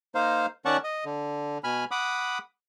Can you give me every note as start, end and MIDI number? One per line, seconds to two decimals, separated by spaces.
0.15 0.46 58
0.15 0.46 63
0.15 0.46 72
0.15 0.46 77
0.65 0.77 51
0.65 0.77 61
0.65 0.77 74
0.65 0.77 78
0.65 0.77 81
0.65 0.77 85
0.84 1.04 75
1.05 1.58 50
1.64 1.84 47
1.64 1.84 80
1.64 1.84 83
1.64 1.84 89
1.91 2.38 78
1.91 2.38 83
1.91 2.38 86
1.91 2.38 87